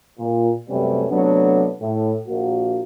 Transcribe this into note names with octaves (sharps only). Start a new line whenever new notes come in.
A#2
F#2 C3 G3 A3 B3 C#4
C3 F#3 A3 B3 D4
A2
A#1 A#3 F#4